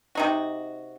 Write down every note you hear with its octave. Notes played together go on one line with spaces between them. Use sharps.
C3 D#4 F#4